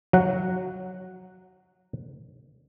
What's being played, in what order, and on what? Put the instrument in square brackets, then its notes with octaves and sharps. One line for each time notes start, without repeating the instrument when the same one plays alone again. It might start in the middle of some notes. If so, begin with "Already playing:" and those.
[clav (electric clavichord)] F#3 F#5